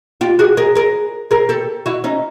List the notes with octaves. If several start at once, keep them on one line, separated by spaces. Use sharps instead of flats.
F4 G4
F#4 G#4
G#4 A#4
G#4 A#4
G#4 A#4
G4 A4
E4 F#4
C#4 D#4